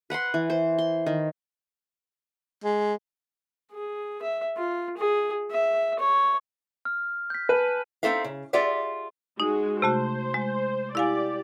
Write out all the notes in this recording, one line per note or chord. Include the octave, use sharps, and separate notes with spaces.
B4 F#5 B5 C6
E3
C5
C6
D#3
G#3
G#4
E5
F4
G#4
E5
C#5
F6
G6 B6
B4 G#5 A5 D#7
C4 D#4 F#4 A4 E5 F5
C#3
F4 G4 G#4 D5 E5 F#5
G#3 D#4 F#4 G#4
C3 A3 F#4 C5
G#3
E4 G4 D5 F5 G#5